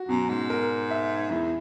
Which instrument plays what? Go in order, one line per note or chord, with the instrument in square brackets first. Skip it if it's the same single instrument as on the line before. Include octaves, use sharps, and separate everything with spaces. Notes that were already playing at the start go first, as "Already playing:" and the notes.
Already playing: [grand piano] F#4
[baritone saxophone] F#2 [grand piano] B2
[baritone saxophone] G#2
[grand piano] A#4
E5
[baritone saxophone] E2 [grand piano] E4